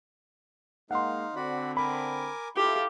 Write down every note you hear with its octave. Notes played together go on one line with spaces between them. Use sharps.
G#3 A#3 D#4 F5 F#5 C6
D3 C4 F#4 D5 B5
A#4 G#5 B5 D6
E4 F4 G4 A4